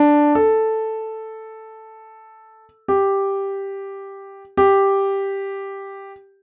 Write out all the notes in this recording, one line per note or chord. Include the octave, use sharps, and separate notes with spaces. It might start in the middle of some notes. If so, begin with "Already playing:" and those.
Already playing: D4
A4
G4
G4